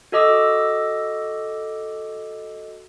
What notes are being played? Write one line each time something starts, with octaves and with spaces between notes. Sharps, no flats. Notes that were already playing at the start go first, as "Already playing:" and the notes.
F#4 A4 D#5 D6 E6